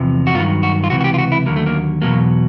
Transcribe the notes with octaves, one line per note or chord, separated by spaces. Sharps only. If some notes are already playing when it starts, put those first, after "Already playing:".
Already playing: E2 C3 F3
F#4
G2 D#3 F#3 F4
F#4
F4
C#2 C3 E3 F#4
F#4
G4
F4
F#4
E4
D#2 D3 F#3 A#3
A3
A#3
E2 B2 F#3 A#3